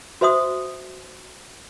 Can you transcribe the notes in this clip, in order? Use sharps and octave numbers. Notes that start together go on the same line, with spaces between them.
F#4 C5 E5 C6 D#6